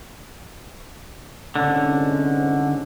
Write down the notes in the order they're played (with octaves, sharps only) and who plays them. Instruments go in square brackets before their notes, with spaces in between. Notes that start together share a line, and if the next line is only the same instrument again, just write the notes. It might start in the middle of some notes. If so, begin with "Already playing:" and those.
[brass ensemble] C2 G#2 C#4 [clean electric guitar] D3